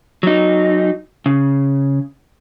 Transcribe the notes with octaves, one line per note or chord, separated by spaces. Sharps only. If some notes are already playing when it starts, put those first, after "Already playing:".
F#3 D#4
C#3